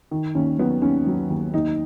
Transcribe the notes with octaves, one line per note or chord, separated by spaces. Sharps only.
D#3
D#2 C#4
F#3 B3
D#2 C#4
F#3
D#2
D#2 D#4